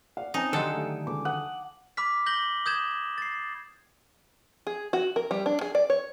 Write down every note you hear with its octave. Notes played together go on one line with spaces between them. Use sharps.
D5 F5 F#5
C4 C#4 D#4 G#5 A5
D3 D#3 F#3 G4 A4 C6
A3 G4
C#2 D6
F#5 D#6
B5 D6 F6 B6
G6 A#6 F#7 G7
D#6 G6 G#6 E7
A6 C7
G#4
F#4
A#4
G3
D4
G#4
D5
C#5